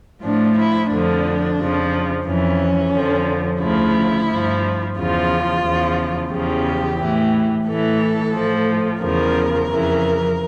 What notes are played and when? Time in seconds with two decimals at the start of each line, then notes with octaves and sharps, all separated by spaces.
0.21 A2 F3 D4
0.56 E4
0.89 F2 D3 F3 D4
1.57 F2 C#3 F3
2.25 F2 E3 C#4
2.93 F2 D3 F3
3.60 D2 C#3 F3 E4
4.28 G2 F3
4.95 E2 C#3 F3 F4
5.63 E2 C#3 F3
6.31 E2 C#3 F3 G4
6.98 A2 E3
7.66 A2 E3 A4
8.34 A2 F3
9.01 E2 C#3 F3 A#4
9.69 F2 C#3 E3